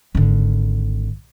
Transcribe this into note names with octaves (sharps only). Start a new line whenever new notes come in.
G#1 D3